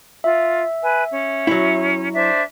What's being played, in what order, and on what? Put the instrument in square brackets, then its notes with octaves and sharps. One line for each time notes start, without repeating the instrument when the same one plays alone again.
[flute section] F4 [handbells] E5
[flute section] B4 G#5
C#4
[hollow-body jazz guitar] F#3 E4
[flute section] D4 C5 E5